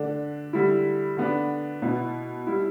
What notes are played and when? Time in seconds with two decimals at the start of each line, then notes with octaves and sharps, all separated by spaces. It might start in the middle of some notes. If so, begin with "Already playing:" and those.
Already playing: D3 A3 D4
0.53 D3 G3 E4
1.17 D3 B3 D4
1.82 B2 B3 E4
2.47 G3 E4